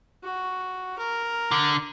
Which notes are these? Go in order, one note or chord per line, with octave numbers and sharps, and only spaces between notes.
F#4
A#4
D3